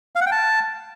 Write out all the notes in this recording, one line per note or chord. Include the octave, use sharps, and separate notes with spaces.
F5
F#5
G5
A5